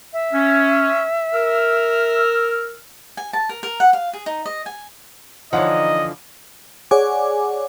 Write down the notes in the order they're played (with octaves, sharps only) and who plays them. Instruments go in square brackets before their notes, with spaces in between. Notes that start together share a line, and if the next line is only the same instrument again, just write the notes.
[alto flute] E5
[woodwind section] C#4
A#4 E6 F6
[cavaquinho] G#5
A5
A#4
A#4
F#5
F5
G#4
D#4
D#5
G#5
[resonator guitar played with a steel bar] D3 E3 F3 [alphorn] D#4 [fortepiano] C#5 F#5 [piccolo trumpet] D#5
[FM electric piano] G#4 C#5 D5 F#5 G#5 D6